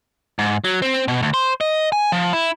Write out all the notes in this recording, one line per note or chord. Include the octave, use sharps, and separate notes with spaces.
G#2
F#3
C4
B2
D2
C5
D#5
G#5
F3
E4